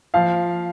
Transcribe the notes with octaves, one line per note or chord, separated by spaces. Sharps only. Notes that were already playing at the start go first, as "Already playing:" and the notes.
F3 F5